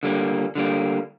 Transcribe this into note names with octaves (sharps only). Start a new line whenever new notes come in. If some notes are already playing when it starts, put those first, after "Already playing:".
D3 G3 A#3
D3 G3 A#3